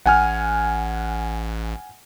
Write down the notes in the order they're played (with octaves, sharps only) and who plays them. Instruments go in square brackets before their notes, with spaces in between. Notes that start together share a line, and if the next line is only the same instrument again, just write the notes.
[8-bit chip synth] A1 [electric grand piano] F#5 G#5 F6